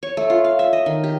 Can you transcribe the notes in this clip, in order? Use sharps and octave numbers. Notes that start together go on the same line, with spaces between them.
C#5
A3
F4
F5
E5
D#5
D#3
G4